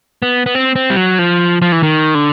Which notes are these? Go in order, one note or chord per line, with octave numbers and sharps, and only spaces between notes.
B3
B3
C4
C4
G3
F#3
F3
F3
E3
D#3
D3